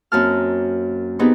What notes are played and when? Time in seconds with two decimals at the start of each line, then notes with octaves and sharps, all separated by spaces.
0.12 F#2 A#3 C4 F#4 A5 F6
1.19 B3 C4 D#4 G4 G#4 B4